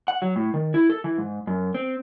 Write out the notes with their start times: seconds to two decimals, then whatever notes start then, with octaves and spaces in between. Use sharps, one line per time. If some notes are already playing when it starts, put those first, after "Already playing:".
0.08 F#5
0.22 F#3
0.36 A2
0.54 D#3
0.74 E4
0.90 A4
1.04 E3
1.18 G#2
1.47 F#2
1.74 C4